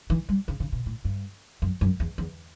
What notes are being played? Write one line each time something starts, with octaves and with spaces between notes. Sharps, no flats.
E3
G3
C#3
C#3
B2
A2
G2
F#2
F#2
E2
E2